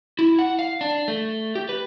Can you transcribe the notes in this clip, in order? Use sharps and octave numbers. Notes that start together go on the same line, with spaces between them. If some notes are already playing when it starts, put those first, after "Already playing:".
E4
F#5
F5
D4
A3
G4
B4